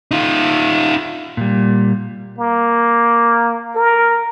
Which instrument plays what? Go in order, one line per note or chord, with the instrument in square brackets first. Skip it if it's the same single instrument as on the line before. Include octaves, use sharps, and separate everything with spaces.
[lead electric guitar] D#4 F4
[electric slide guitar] A#2 G3
[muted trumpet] A#3
A#4